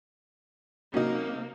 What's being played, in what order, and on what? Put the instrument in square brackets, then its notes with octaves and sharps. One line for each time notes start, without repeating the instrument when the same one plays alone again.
[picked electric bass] C3 C#4 [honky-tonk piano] F#3 D#4 [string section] A#3